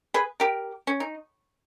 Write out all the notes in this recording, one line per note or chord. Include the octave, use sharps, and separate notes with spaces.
G#4 B4
G4 A#4
C#4
D#4